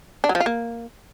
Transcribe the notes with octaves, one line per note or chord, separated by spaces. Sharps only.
D4
F#3
F3
F4
A#3